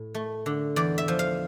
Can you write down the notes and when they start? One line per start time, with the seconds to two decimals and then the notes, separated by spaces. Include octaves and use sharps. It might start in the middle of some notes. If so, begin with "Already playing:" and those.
Already playing: A2
0.14 A3
0.46 D3
0.76 E2 D5
0.98 E5
1.08 F3
1.19 F5